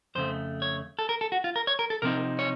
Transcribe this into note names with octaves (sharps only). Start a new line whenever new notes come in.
F2 C#3 A3 C5
C#5
A4
A#4
A4
F#4
F4
A#4
C#5
A#4
A4
C3 F3 C4 D#4 A#4
C#5